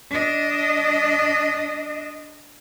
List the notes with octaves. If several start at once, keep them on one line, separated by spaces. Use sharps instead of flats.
D4 D#5